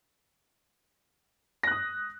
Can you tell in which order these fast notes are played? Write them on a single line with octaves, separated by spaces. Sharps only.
A#6 F#6 D#6